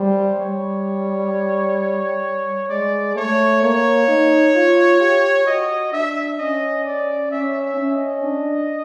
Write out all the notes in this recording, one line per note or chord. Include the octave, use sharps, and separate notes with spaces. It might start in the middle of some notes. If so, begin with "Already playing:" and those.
Already playing: G3 C5
G3 C#5
G#3 D5
A3 C#5
A#3 C#5
D#4
F4
G4
F#4 D#5
D4 E5
C#4 D#5
D5
C#4 E5
E5
C#4
D#5
D4